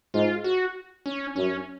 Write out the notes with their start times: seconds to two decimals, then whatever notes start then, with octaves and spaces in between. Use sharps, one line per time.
0.14 G#2 F4
0.44 F#4
1.06 C#4
1.36 F#2 C#4